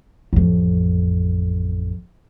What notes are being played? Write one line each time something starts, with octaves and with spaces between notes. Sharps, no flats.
A1 F2